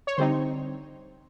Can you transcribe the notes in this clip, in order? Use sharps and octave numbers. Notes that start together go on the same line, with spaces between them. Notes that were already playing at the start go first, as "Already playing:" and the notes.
C#5
D3 G3 C4 D#4 C5